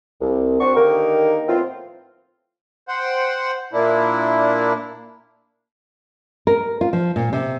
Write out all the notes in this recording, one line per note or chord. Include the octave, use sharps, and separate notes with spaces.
C2
C4 D4 F#4 C#6
D3 D#3 A#3 D#4 G4 A#4
A2 F3 B3 C4 F4
C5 F#5 G5
A#2 A#3 D4 E4
A#4
F4
F3
A#2
C3